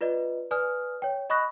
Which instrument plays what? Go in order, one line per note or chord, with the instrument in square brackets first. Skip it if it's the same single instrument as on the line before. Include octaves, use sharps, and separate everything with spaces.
[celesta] F4 B4 D5 D#5
B4 D5 G#5 D#6 F6
C#5 G5
D#5 B5 C#6 D#6 F#6 A#6